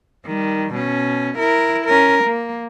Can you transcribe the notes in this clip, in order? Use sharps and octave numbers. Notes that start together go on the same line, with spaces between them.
D#3 G3
B2 C#4
E4 A#4
C#4 A#4
A#3